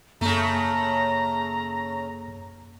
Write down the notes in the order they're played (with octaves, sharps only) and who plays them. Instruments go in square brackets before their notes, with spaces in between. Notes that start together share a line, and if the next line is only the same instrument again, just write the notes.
[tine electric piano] F#2 A#3 [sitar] C#3 A3 [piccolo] A#5